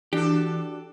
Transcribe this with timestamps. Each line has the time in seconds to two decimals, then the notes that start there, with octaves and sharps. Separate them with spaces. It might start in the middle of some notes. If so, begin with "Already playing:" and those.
0.13 E3 D4 F#4 G4 A4